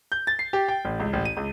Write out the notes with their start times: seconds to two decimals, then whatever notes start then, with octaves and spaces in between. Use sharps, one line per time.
0.12 G6
0.27 A6
0.39 C7
0.53 G4
0.69 G5
0.85 A1
1.00 C#2
1.13 A1
1.25 D#7
1.37 C#2